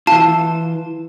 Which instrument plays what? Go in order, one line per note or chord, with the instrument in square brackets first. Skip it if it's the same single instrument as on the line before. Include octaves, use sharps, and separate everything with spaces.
[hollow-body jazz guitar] E3 F4 [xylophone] A5